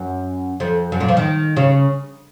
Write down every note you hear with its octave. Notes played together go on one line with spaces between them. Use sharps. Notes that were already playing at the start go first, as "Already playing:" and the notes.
Already playing: F#2
F2
F#2
A#2
F3
D#3
C#3